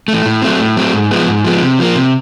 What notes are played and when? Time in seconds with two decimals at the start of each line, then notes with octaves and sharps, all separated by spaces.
0.08 E3 A3
0.26 A2
0.42 F#3 A3 C4
0.59 A2
0.77 F#3 A3 C4
0.93 G#2
1.11 F3 G#3 B3
1.27 G#2
1.45 F3 G#3 B3
1.62 C3
1.79 F3 A#3
1.95 C3